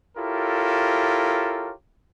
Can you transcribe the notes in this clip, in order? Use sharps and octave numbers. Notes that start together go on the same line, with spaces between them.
E4 F4 G4 A4 A#4 C#5